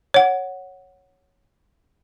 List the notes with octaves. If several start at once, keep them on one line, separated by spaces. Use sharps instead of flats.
C#5 F#5